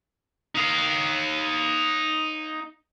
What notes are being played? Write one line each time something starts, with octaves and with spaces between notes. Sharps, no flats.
D#4 F5